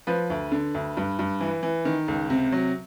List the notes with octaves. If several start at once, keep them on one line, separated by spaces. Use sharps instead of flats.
F3 B4
D2
D3
D2
G2
G2
E3
E3
D#3
C#2
C3
F#3